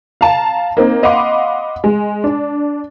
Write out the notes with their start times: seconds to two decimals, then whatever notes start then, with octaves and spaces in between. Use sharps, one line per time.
0.21 F5 A5 A#5
0.77 A#3 C4 D#4
1.03 D#5 F5 F#5 B5 C6 D6
1.84 G#3
2.24 D4